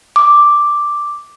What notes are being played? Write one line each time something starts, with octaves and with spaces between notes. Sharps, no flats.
D6